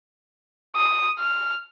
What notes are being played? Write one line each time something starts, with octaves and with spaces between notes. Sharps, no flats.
D#6
F6